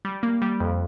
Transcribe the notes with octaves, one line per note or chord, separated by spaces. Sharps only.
G3
A#3
G3
F2